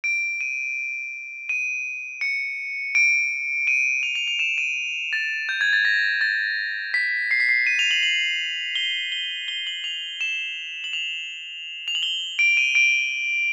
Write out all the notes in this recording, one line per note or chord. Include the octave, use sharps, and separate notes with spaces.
D7
D#7
D#7
C#7
D7
D#7
F7
F7
F7
E7
D#7
A6
G6
G#6
A6
A#6
A6
B6
C7
B6
C7
D#7
F7
F#7
F#7
G7
G7
G7
F#7
F7
E7
F#7
F7
F7
F#7
G7
D7
D#7
D7